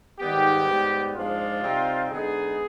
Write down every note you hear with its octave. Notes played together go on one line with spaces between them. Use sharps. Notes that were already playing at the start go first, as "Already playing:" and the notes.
G#2 D#3 G3 B3 G4
G#2 G3 B3
G#2 F3 G#3 D4 F4
C3 G3 C4 D#4
D3 G#3 B3 D#4 G#4